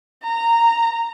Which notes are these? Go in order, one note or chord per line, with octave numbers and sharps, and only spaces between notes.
A#5